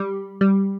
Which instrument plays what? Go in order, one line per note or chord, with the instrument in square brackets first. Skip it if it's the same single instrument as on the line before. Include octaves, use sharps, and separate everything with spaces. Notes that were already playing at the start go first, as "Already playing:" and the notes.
Already playing: [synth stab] G3
G3